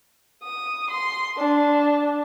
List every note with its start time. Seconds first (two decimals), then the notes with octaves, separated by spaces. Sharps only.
0.43 D#6
0.90 C6
1.37 D4